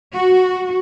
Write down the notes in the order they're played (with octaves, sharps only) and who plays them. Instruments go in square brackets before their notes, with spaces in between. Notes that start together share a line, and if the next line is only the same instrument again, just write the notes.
[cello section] F#4